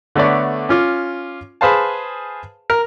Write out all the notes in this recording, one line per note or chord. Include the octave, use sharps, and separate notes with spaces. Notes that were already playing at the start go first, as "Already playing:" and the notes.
D3 A3 B3 C#5 D5
C#4 F4 D6
G#4 B4 C5 F5 A5
A#4